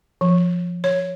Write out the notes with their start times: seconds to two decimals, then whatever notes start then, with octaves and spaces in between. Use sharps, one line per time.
0.21 F3
0.84 C#5